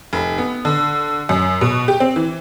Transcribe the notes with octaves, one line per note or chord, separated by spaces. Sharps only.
F1
B3
D3
F#2
B2
G4
C4
E3